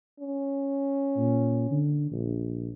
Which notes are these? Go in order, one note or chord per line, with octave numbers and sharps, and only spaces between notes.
C#4
A#2
D3
A#1